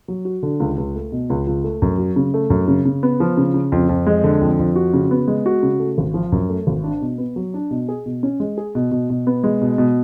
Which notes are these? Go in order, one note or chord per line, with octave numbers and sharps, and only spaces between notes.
F#3
F#4
D3
C#2
C#2
A3
B2
C#2
C#2
A3
F#2
F#3
C#3
A3
F#2
C#3
C#3
B3
F3
C#3
C#3
F2
F2
G#3
D3
F2
F2
F#4
C#3
B3
G#3
F#4
C#3
A3
G#1
F3
F#2
A3
G#1
D4
B2
B3
F#3
D4
B2
G#4
B2
C#4
G#3
G#4
B2
B2
B2
B3
G#3
B2
B2